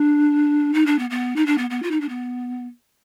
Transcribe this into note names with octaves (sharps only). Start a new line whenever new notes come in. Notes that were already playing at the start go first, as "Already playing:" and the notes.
Already playing: D4
D#4
D4
B3
B3
D#4
D4
B3
B3
F4
D#4
D4
B3